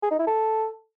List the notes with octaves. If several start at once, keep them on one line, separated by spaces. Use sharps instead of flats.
G#4
D#4
E4
A4